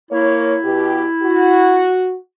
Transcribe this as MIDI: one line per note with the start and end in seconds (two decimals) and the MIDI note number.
0.11 0.54 58
0.11 1.91 64
0.11 0.54 73
0.63 1.03 47
0.63 1.03 67
1.22 2.15 66